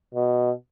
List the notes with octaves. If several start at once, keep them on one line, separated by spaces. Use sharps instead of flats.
B2